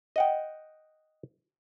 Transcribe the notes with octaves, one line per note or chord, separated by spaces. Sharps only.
D#5 F#5 G5